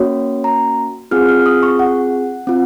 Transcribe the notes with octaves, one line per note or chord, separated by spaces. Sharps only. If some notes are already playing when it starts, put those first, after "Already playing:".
Already playing: A#3 C#4 F#4 C#5
A#5
C4 F4 G#4 F6
F6
D#6
C#6
F#5
C4 F4